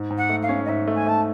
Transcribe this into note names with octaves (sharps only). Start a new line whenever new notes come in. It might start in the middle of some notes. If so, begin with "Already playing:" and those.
Already playing: G#2
G#2
F#5
A3
F5
C#4
D#5
G#2 E5
A3
G#5
A3 A5